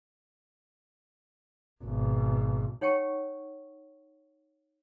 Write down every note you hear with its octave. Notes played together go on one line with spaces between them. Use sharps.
G#1 B2
D#4 C#5 F#5 G5 A5 C#6